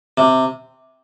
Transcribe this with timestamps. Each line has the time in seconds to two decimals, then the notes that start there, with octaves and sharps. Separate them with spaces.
0.17 C3